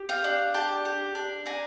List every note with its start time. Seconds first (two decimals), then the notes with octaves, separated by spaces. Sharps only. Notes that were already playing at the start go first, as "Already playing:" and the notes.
Already playing: G4
0.09 F5 G5
0.24 D4
0.54 G4 G5 A5
0.85 G4
1.15 D4
1.46 D4 G#5 A#5